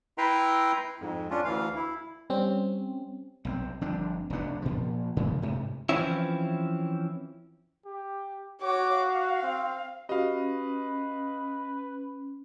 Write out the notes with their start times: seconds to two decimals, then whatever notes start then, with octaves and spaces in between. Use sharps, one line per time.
0.18 E4 B4 E5 G5 A#5 C6
1.01 F2 G#2
1.31 C#4 D4 F4
1.45 D2 E3 F5
1.76 E4
2.30 G3 C4 C#4
3.45 B1 F#3 C4
3.81 G1 F3 C4 D4
4.30 F1 D2 B3 D4
4.62 A#2 F3
5.17 G#2 C#3 E3 F3
5.42 D2 G#2 C3
5.89 E3 F3 C4 C#4 E4
7.85 G4
8.62 F#4 C#5 D6
8.97 F5
9.43 C4
10.09 C#4 F#4 G4 B4 D#5 F5